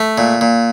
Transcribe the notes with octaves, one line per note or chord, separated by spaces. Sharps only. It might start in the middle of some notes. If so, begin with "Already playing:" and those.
Already playing: A3
A#2
A#2